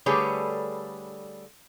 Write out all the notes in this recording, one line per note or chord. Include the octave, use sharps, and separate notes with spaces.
D3 G3 A3 G#4 B4 C#5